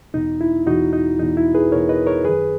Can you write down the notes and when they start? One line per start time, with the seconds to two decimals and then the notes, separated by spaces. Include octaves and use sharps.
0.14 E2 B2 D#4
0.41 E4
0.67 E2 B2 D#4 F#4
0.93 D#4
1.19 E2 B2 D#4
1.37 E4
1.54 G#4 B4
1.71 E2 B2 A#4 C#5
1.89 B4 D#5
2.07 A#4 C#5
2.24 F#2 D#3 G#4 B4